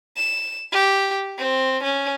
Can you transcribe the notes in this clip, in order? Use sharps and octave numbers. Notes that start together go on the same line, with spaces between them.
E7
G4
C4
C#4